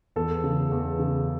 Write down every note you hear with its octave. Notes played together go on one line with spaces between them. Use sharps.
E2 A4
C#3
E2
C#3